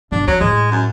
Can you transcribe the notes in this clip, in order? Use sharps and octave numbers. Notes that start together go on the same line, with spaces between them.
G1 B2 D4
F2 F#3
A2 G#3
F#2